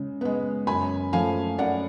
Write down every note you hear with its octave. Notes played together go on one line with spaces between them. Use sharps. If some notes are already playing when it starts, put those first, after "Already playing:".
Already playing: C#3 G#3
G#3 B3
F#2 G#5 B5
F3 A3 F5 G#5
F#2 D5 F#5